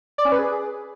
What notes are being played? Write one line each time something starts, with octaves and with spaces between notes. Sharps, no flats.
D5
C#4
B4
G#4